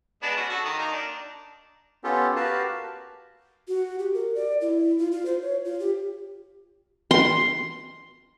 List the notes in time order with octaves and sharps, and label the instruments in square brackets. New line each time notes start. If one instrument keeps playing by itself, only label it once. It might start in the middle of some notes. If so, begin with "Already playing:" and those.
[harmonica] G#3 B3 D4
C#4 F#4
F#4 A4
D#3 D#5
A#3 D#4
D4
[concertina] B3 C#4 F4 G4 A4
F#4 G4 A#4 B4 F5 A5
[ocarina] F#4
G4
A#4
D5
E4
F4
F4
C5
C#5
F4
G4
[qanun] C6